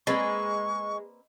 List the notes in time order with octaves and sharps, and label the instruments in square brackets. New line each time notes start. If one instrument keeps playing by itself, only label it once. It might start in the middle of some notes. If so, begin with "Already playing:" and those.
[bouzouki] G#3 [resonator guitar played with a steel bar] A#3 C4 B4 [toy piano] D#5 [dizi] C#6